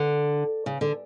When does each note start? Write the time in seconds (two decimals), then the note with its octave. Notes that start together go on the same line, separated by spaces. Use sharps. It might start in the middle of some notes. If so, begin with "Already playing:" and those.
Already playing: D3
0.66 C#3
0.81 D3